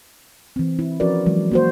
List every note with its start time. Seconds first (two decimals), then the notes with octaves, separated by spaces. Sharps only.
0.56 E3 C4
0.79 E4
1.00 F3 C#4 F#4 A#4 B4 D5
1.26 E3 F#3 G#3
1.52 A#3 F#4 C5